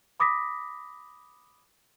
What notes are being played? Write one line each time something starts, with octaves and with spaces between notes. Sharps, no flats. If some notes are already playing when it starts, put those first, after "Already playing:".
B5 D6 D#6 A#6 B6